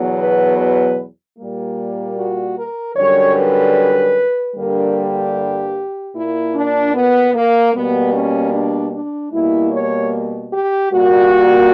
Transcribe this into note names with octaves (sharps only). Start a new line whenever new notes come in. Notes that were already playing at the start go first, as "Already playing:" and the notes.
Already playing: E2 B2 F#3
B4
B4
A#2 G3 A#3
F#4
A#4
F#2 D3 G3 C#5
B4
G2 D3 G3 A#3 A#4
G4
A#2 A#3 E4
D4
B3
A#3
B2 G3 A#3 B3
C#4
D4
D4
B2 G3 A#3 E4
C#5
G4
A#2 G3 A#3 F#4